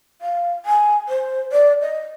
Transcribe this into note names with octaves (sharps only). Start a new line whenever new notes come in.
F5
G#5
C5
D5
D#5